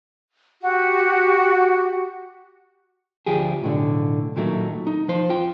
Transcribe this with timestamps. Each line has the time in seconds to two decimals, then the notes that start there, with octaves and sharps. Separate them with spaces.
0.61 F#4 G4
3.26 D2 F3 G4 G#4
3.62 B1 A2 D3
4.36 A#2 D#3 F#3 A3
4.87 D#4
5.08 F3 C5
5.29 F4 G5